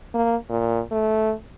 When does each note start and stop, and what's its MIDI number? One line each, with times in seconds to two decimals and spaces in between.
0.14 0.35 58
0.49 0.82 46
0.91 1.33 57